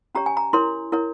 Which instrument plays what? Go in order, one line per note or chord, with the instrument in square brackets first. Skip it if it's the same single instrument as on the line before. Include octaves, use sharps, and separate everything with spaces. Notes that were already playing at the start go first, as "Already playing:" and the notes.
[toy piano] C#4 G4 C#5 A#5
G#5
A#5
E4 A#4 C#5 C6
E4 A#4 C#5